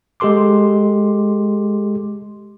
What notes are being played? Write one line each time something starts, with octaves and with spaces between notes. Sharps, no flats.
G#3 G4 A4 C6 D6